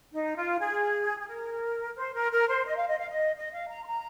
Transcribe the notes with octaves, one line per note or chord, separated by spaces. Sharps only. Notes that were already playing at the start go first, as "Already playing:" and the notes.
D#4
F4
G#4
G#4
A#4
C5
A#4
A#4
C5
D#5
F5
D#5
F5
D#5
D#5
F5
A#5
C6
A#5